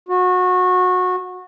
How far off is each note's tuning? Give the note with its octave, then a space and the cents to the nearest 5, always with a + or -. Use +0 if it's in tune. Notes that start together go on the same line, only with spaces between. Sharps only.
F#4 -25